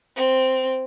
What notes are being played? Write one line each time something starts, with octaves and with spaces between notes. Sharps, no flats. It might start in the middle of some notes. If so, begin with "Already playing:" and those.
C4